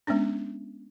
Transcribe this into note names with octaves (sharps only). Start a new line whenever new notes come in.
G#3 B3 C#4 D4